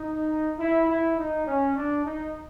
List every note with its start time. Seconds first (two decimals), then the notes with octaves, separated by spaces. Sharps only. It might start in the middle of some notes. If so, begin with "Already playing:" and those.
Already playing: D#4
0.59 E4
0.89 E4
1.17 D#4
1.47 C#4
1.76 D4
2.06 D#4